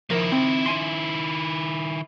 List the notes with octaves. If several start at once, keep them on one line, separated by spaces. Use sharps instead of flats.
D#3 F3 E4 A#4
C4
C#4 G#5 C6